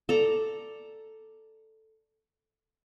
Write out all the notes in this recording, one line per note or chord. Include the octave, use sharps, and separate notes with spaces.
A4 D5 A#5